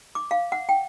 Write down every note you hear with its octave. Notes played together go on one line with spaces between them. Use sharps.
D6
F5
F#5
G5